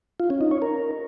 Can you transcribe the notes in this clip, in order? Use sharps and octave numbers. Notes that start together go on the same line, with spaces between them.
F4
C#4
D#4
C#5
A#4